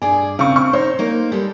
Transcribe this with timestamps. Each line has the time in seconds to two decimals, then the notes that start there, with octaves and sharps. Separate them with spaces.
0.02 G2 G#4 D5 G#5
0.39 C#3 C4 C#6
0.56 C#6
0.73 D#4 C5 C#5
0.99 A#3 D#4
1.32 G3 G#3 A4